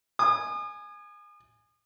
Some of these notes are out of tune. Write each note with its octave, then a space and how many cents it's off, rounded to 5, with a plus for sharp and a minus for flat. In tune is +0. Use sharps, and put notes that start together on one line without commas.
G#5 +0 D#6 -40